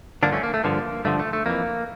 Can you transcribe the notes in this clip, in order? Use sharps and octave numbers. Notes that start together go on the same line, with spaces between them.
G2 D3 F3 A#3 D4
A3 C#4
A#3
A3
G2 D3 F3 A#3
G2 D3 F3 A3
A3
A3
F2 E3 A#3